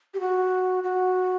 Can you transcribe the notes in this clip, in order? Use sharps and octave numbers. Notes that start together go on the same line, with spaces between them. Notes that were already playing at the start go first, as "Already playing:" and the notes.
G4
F#4
F#4